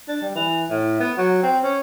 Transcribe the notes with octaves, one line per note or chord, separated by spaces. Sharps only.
D4
G3
E3
A2
B3
F#3
C4
C#4